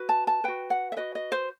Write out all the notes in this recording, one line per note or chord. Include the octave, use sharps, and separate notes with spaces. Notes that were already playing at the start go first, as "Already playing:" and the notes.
Already playing: F#4 B4
A5
A5
F#4 B4 G5
F#5
E5
F#4 B4 D#5
D#5
C5